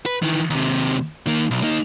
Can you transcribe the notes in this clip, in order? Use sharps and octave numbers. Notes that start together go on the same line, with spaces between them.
B4
D#3 E3
D#2 C3
D#3 A#3
B1
A#3 D#4